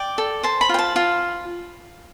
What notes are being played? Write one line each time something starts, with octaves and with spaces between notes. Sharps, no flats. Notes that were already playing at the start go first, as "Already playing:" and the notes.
Already playing: D5 G5
A4
C5 A5
B5
F4 G5
A5
F4